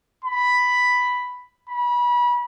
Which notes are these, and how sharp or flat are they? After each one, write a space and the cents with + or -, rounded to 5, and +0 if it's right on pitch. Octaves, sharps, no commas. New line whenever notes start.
B5 +5
B5 -30